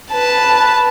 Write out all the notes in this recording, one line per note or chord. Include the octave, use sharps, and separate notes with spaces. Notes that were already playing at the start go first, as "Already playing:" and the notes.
B4 A5